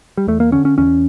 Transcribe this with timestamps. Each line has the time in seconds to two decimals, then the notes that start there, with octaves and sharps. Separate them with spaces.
0.17 G3
0.27 E2 A3
0.40 A#3
0.52 D3 C#4
0.65 C#4
0.78 E2 C#4